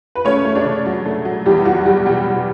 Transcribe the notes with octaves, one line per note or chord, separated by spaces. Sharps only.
B4
A3 C#4 C#5
A3
D4
C#3
F#3
A3
F#3
E2 G3 G4
E2 F#3 F#4
F#3 G3 G4
B2 G3 G4
F#3